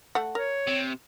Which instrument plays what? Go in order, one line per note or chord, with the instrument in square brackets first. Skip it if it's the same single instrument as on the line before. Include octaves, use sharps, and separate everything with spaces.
[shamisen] A3 F#5
[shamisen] A#4 [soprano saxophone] C#5
[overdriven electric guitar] C3